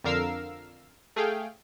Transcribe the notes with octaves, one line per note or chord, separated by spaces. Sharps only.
F2 D3 A#4 F5 E6 C7
A3 G#4 F5 G5